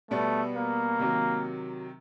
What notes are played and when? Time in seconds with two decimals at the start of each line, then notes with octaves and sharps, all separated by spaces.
0.11 B2 G3 A3 B3
0.56 A#3
1.00 C3 D#3 F#3